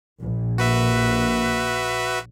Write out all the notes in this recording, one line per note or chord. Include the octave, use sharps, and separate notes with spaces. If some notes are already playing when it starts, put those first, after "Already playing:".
A#1
A#3 F#4 B4 E5